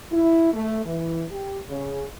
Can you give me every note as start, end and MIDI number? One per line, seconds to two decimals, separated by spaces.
0.12 0.53 64
0.54 0.83 57
0.86 1.24 52
1.31 1.60 67
1.69 2.04 49